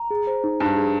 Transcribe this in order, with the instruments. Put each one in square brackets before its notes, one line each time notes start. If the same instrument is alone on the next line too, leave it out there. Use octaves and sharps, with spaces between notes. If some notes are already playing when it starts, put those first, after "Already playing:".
Already playing: [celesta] A#5
G#4
C5
D#4
[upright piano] G2 [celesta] D#4
[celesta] G#4